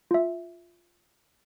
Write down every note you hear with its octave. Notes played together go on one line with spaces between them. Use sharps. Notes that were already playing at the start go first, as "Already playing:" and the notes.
F4 E5